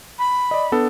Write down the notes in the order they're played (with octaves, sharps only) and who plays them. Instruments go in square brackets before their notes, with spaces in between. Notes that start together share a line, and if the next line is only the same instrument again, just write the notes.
[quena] B5
[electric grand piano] D5 D#5
B3 D4 A4